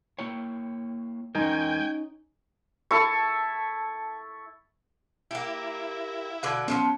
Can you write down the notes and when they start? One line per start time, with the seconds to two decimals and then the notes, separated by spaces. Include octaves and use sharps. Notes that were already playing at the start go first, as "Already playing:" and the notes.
0.19 A#3 E4 C#5 G5
1.35 E2 G#3 C#4 D#4 A#4 G5 G#5
2.91 E4 A4 A5 C#6 E6
5.31 A#3 E4 G4
6.43 B2 D3 B4 F5 D6 G#6
6.68 D#3 F3 F#3 B3 C#4